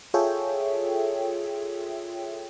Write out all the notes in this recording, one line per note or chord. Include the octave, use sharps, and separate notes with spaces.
F4 G#4 A4 C#5 E5 G5